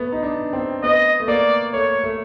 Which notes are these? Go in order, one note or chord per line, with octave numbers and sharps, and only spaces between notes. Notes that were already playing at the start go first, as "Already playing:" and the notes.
Already playing: A3 B3
D#4
D4
C4
B3 D#5
A3
A#3 D5
A3 C#5
A3